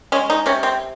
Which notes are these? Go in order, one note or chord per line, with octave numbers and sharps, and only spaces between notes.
G#3 C#4
D#4
C3 C#4
C4